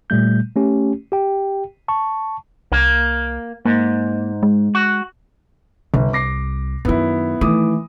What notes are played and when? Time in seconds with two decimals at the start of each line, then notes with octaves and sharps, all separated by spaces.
0.10 A#2 G3 A3 G6
0.56 A3 C#4 G4
1.12 G4 G5
1.88 A5 C#6
2.72 C2 A#3
3.66 G#2 A#3
4.43 G#3
4.75 F#4
5.94 G1 C2
6.13 D6 A#6 C7
6.85 F#2 D#3 B3 E4
7.41 D#3 E3 A3 D6 D#6